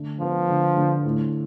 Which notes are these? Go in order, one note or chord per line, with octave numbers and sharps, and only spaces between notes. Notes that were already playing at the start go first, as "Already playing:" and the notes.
Already playing: D3 A3
F3 B3
D3
D3
A2